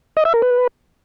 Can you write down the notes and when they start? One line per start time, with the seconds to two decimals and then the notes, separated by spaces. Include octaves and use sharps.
0.17 D#5
0.25 E5
0.34 A#4
0.42 B4